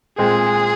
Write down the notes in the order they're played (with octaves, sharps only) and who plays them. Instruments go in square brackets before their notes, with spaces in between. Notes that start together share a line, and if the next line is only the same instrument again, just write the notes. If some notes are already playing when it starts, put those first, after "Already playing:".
[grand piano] A#2 G#3 C4 [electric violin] G#4